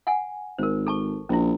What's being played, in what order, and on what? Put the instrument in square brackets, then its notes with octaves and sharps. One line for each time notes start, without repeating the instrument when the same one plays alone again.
[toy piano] F#5 G#5
[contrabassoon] G#1 [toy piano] A#4 C5
[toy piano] A4 A5 C#6
[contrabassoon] A#1 [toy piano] C#4 E4